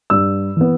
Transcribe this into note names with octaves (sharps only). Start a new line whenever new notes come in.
G2 E6
E3 B3